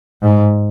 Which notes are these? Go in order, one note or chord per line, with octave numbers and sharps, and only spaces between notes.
G#2